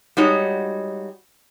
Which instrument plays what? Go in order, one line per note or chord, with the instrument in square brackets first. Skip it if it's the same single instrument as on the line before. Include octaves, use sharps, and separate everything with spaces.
[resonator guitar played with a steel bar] G3 G#3 D#4 F#4 C#5